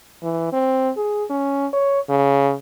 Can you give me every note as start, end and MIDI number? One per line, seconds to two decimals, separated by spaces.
0.23 0.51 52
0.53 0.91 60
0.97 1.24 68
1.30 1.67 61
1.73 2.00 73
2.09 2.54 49